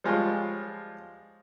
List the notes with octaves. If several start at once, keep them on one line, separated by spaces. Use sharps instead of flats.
F3 G3 G#3 F4 C#5